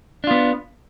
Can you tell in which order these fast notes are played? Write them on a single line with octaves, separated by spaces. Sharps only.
D4 F4 B3